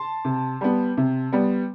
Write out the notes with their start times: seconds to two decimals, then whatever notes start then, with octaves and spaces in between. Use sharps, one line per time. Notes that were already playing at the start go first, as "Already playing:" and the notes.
Already playing: A5 C6
0.25 C3
0.61 G3 B3
0.97 C3
1.33 G3 B3